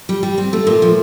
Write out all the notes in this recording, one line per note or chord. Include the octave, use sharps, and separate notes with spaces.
G3
G3
C4
A3
A#2
F3